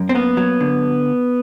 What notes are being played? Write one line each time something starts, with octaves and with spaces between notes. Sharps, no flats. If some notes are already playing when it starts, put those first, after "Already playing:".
Already playing: F#2
C4
A#3 B3
F#3
D3